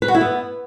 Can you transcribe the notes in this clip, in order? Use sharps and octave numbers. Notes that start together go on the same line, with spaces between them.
B4
F#4
E4
B3